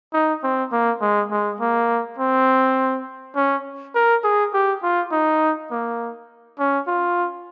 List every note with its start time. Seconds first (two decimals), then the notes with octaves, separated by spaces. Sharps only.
0.13 D#4
0.43 C4
0.72 A#3
1.01 G#3
1.32 G#3
1.61 A#3
2.19 C4
3.36 C#4
3.95 A#4
4.24 G#4
4.53 G4
4.82 F4
5.12 D#4
5.71 A#3
6.59 C#4
6.87 F4